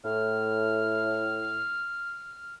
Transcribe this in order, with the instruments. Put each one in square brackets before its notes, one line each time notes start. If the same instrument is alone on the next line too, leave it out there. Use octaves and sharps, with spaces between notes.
[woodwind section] A2 [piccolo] F6